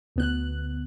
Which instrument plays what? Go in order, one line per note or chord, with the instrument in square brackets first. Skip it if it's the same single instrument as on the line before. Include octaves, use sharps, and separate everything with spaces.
[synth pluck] D2 B3 F#6